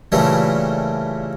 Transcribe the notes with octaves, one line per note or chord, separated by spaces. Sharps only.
A#2 C#3 E3 G3 A3